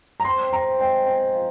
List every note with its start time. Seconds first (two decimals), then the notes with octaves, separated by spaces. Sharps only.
0.20 A#5
0.25 C4 C6
0.52 C4 A#5
0.79 G#3 G5
1.06 C4
1.33 F3